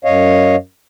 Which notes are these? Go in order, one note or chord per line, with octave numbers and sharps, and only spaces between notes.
F#2 C#5 D#5 F5